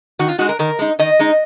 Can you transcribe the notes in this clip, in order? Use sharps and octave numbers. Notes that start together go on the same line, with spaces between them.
D#3 F#4
F4
G#3 D#4 F#4
A#4
D#3 A#4
G#3 D#4
D#3 D#5
G#3 D#4